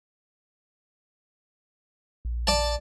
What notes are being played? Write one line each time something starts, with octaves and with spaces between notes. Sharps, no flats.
A#1
A#1 D5 A5